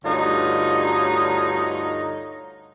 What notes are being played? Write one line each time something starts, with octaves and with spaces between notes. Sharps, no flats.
D2 G2 D3 D#4 F4 C#5